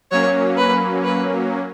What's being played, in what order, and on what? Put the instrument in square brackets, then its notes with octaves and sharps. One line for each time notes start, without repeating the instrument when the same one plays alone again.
[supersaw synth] F#3 A#3 C#4 [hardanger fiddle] C#5
[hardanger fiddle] B4
B4